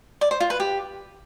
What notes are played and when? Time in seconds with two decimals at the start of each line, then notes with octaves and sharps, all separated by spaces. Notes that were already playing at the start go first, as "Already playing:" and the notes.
0.21 D5
0.31 C5
0.40 F4
0.50 B4
0.60 G4